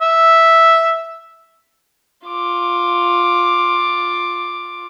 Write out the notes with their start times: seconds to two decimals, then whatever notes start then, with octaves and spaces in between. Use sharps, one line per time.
0.01 E5
2.27 F4 D6